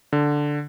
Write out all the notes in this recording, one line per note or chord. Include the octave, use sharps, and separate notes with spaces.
D3